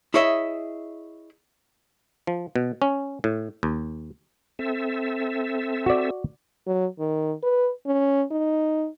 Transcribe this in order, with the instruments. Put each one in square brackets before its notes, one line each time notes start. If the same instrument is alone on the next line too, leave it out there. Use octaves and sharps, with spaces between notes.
[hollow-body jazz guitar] E4 G#4 C#5 D#5 E5
[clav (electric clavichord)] F3
B2
C#4
A2
D#2
[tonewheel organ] C4 A4 E5
[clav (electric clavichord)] F#4 D5
[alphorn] F#3
D#3
B4
C#4
D#4